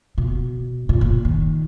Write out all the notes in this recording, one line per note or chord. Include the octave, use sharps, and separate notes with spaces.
B2
A#2
A#2
D#3